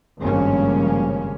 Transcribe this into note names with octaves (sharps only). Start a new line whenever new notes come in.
G#1 G2 C#3 F3 A#3 C#4